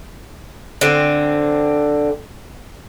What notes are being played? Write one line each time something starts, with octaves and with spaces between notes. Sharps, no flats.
D3 C4